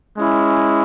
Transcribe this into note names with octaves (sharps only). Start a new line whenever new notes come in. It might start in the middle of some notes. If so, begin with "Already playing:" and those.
G#3 C#4 E4